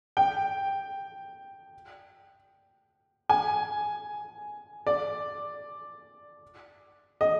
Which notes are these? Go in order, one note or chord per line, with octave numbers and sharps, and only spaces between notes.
G5
G#5
D5
D#5